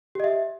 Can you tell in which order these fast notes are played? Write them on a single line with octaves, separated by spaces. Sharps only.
G4 D#5 E5